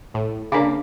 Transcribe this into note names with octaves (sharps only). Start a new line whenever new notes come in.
A2
C#3 A#3 D4 B5 D6